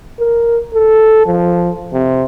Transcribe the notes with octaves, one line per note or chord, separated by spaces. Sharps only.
A#4
A4
F3
C3